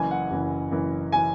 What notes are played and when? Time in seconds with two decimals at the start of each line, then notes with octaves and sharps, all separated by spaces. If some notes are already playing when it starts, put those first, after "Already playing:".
Already playing: F#1 F#2 E3 G#5
0.11 F#5
0.30 F#1 F#2 E3
0.71 F#1 F#2 E3
1.12 E3 G#5